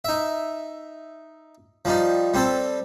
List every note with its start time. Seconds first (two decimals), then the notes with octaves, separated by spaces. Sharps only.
0.05 D#4 E5
1.85 F3 G3 D#4
2.34 G3 C4 A4